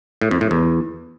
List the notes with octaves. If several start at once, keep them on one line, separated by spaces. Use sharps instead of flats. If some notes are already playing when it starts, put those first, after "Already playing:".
A2
F2
A2
E2